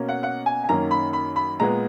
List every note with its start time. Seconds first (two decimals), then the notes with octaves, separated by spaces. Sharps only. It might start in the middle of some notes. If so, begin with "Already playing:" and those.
Already playing: B2 A#3 C#4
0.08 F#5
0.23 F#5
0.46 G#5
0.64 G#5
0.69 F#2 D#3 A#3 C#4 A#5
0.91 B5
1.13 B5
1.36 B5
1.60 A#2 G#3 B3 A#5